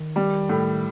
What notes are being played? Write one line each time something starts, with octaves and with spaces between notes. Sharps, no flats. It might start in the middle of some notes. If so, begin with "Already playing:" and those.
Already playing: D#3
G3
A2